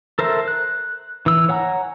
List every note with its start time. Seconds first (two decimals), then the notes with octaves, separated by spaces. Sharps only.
0.19 A4 A#4 C5 E5
0.48 F#6
1.26 E3 E6
1.49 C#5 F#5 G#5 A#5